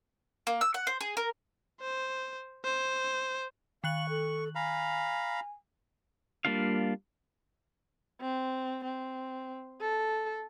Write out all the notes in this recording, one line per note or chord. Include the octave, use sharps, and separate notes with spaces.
A#3
E6
F#5
C5
G#4
A#4
C5
C5
D#3 F5 C#6 F#6 F#7
A4
F5 G#5 A#5 B5
G3 A#3 D4 F4 F5
C4
C4
A4